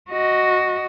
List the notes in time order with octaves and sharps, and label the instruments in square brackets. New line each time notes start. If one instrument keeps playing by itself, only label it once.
[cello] F#4 D#5